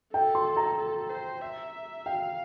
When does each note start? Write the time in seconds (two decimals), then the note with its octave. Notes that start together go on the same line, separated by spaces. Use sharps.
0.14 A4 G5
0.35 C6
0.56 A#5
0.78 A4
1.09 C5
1.42 E5
2.06 F5 G5